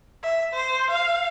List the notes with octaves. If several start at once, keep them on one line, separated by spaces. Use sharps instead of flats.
E5
C5
F5